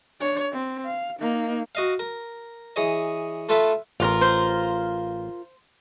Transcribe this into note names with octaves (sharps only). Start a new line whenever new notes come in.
D4 C#5
C4
F5
A#3 D#4
F#4 D#5 F5
A#4
E3 G#4 C#5 D#5
A3 F4 A4 B4 E5
A1 F4 F#4 A#4
C5